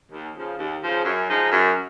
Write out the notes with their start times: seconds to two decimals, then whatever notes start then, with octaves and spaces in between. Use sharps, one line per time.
0.11 D#2
0.34 C#3 F3
0.58 D#2
0.82 C#3 F3
1.04 F#2
1.28 F3 G#3 D#4
1.52 F#2